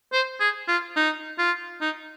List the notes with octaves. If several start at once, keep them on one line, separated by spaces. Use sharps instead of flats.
C5
G#4
F4
D#4
F4
D#4